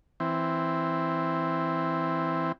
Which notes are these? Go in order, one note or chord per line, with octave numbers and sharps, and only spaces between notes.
E3 C4